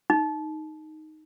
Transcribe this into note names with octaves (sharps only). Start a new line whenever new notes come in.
D#4